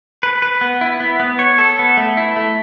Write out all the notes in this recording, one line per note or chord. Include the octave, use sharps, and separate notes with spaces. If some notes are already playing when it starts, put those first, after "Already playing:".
B4
B4
B3
E4
B3
B3
C#5
A4
B3
A3
E4
A3